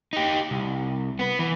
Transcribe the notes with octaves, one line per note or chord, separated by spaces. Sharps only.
D#4 G4
C2
B3 B4
E3